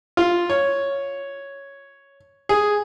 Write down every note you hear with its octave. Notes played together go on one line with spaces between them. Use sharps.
F4
C#5
G#4